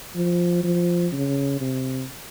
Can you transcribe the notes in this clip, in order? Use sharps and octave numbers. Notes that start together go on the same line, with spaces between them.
F3
F3
C#3
C3